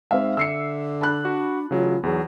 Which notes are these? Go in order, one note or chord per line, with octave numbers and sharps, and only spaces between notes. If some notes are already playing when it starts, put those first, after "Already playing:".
G#2 C4 E5 F5
D3 E6 C7 C#7
D4 A5 B5 F#6
F#4
A1 C#3 F#3 F4
B1 E2 F#3 G#4